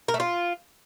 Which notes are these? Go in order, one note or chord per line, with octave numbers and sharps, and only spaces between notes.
A#4
A3
F4